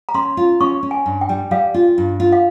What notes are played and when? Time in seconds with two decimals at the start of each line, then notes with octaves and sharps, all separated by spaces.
0.09 A#5
0.14 C#4 C6
0.37 F4
0.60 C#4 C#6
0.83 C#4
0.91 G#5
1.06 G2
1.21 G5
1.29 G3
1.51 G3 F5
1.74 F4
1.98 G2
2.20 F4
2.32 F5